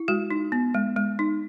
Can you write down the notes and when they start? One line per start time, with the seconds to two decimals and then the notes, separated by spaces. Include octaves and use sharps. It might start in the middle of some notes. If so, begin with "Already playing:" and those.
Already playing: E4
0.08 G#3 F#4
0.30 D#4
0.52 B3
0.74 G#3
0.96 G#3
1.19 D#4